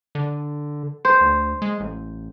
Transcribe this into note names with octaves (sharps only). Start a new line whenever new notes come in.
D3
C5
D2
G#3
A1